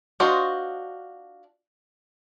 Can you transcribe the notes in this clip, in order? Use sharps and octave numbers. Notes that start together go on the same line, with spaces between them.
D4 F4 F#4 C5 D#5